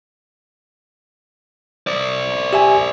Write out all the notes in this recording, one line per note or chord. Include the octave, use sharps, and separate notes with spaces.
C5 D5
G4 E5 G#5